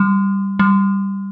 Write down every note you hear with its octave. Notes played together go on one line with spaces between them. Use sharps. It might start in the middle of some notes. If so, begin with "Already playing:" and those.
Already playing: G3
G3